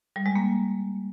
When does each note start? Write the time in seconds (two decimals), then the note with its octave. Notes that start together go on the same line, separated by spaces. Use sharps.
0.16 G3
0.26 G#3
0.36 A#3